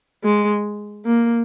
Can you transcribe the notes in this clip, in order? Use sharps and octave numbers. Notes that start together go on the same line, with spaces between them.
G#3
A#3